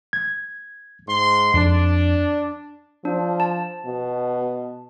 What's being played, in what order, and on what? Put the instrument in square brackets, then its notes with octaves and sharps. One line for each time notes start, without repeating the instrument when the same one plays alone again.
[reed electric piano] G#6
[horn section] G#2 C6
[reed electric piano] F2 [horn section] D4
[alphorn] F3 [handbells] D4
[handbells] A5
[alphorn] B2